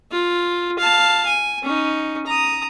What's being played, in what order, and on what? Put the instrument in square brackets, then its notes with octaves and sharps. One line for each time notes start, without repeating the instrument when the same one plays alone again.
[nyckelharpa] F4
F5 A5
G#5
C#4 D#4
A#5 D#6